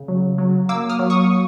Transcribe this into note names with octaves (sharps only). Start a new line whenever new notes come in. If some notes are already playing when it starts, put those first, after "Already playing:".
Already playing: C#3
F#3
F#3
A#3 D6 E6
D#6 F6
F#3
C#6 D#6